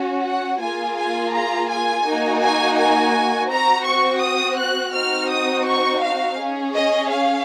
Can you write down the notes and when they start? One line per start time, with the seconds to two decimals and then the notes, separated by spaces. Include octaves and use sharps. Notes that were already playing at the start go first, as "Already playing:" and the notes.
Already playing: C#4 F#4
0.25 F#5
0.61 A#3 F4 G#4 G#5
0.97 G#5
1.33 A#5
1.70 G#5
2.05 A#3 D#4 F#4
2.42 G#5
2.77 G#5
3.50 C4 F#4 A#5
3.86 C#6
4.22 D#6
4.58 F#6
4.94 C4 D#4 F#4 F6
5.31 D#6
5.67 C#6
6.03 F5
6.40 C#4 G#4
6.75 D#5
7.11 F5